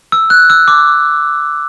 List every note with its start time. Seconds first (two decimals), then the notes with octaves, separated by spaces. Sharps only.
0.12 E6
0.30 F#6
0.50 E6
0.68 D6